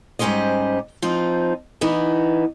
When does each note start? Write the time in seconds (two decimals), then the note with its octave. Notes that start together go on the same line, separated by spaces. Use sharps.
0.19 G#2 G3 C#4 G4 C5 D#5
1.02 F3 C4 D#4
1.81 E3 B3 D#4